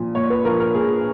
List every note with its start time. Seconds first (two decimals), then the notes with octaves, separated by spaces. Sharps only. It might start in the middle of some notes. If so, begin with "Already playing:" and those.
Already playing: A#2 F3
0.15 A#2 C#5
0.30 B4
0.45 F3 A#4
0.60 A#4
0.74 A#2 G#4